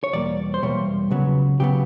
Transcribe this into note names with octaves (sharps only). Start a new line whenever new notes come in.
C#5
E2 B2 G3 A#3 D5
C5
E2 B2 G3 A#3 C#5
C#2 C#3 F#3 B3
C#2 C#3 F#3 B3 G4